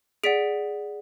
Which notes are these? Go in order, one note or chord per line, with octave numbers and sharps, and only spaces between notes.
G#4 D5 F#5 B6 D7